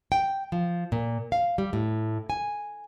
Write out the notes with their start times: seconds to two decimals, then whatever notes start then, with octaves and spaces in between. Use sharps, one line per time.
0.12 G5
0.52 F3
0.92 A#2
1.32 F5
1.58 G3
1.73 A2
2.30 G#5